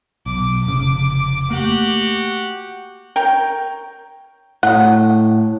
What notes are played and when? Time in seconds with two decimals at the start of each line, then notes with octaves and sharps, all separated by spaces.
0.26 B1 D6
0.66 F1 C#3
1.50 A3 A#3 F#4 G4 F#5
3.16 A#4 C#5 G5
4.63 A2 F#3 G#3 F#5